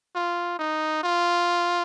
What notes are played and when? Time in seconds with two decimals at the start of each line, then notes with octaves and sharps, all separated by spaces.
0.15 F4
0.59 D#4
1.03 F4